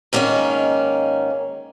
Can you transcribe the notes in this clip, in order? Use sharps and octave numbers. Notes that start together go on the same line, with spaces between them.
G#2 D#3 A#3 C#4